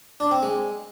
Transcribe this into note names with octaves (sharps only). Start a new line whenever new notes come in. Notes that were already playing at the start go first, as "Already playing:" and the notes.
D4
C4
G#3